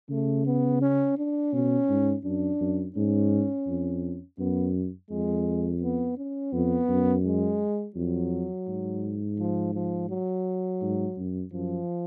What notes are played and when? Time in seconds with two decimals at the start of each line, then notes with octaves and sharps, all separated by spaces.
0.10 C#3 A3
0.46 B3
0.82 C#4
1.18 D4
1.53 B2 C#4
1.89 G#2
2.24 F#2 D4
2.61 F#2
2.96 G#2 C#4
3.67 F2
4.39 F#2 B3
5.11 F2 G#3
5.82 B3
6.18 C#4
6.53 F2 B3
6.89 F#2
7.25 G#3
7.96 F2 F#3
8.68 G#2
9.39 F3
9.74 F3
10.10 F#3
10.82 G#2
11.18 F#2
11.53 F#2 F3